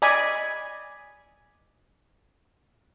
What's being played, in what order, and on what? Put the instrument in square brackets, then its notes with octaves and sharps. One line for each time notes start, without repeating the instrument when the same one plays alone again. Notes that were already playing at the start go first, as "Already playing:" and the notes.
[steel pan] D5 D#5 G#5 B5